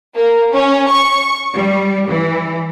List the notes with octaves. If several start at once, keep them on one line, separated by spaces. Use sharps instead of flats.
A#3
C#4
C#6
G3
E3